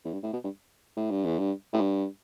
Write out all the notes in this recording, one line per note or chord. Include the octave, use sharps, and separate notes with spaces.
E2
G2
A2
B2
G2
A2
G2
E2
G2
A2
G2